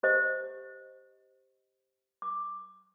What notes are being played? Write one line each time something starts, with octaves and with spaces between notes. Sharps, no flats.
G4 C5 D#5
D6